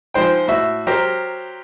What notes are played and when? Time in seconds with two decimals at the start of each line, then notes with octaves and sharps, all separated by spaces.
0.14 F3 G#3 D#4 C5 G5
0.48 A2 F#4 E5
0.87 F#3 G4 A#4 C5 A#5